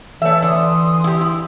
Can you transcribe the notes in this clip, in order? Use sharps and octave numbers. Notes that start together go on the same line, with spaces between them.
E3 A3 A4 C#5 E5
D3 C6 D#6
E4 G4
E4